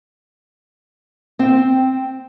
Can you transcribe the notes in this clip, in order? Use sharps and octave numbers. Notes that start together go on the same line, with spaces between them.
C4 G5